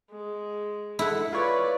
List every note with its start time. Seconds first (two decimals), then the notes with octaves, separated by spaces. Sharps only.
0.11 G#3
0.99 G#3 E4 A4 F#5
1.33 F4 B4 C#5 D5